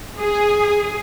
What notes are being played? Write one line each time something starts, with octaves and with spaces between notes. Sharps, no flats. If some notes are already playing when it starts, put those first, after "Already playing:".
G#4